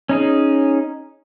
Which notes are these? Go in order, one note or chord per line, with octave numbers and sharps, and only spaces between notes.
C#4 D#4 G#4